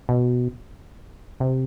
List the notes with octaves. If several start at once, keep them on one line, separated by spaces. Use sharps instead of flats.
B2
C3